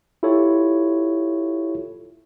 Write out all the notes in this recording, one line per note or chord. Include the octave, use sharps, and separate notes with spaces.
E4 F4 G4 A4 C#5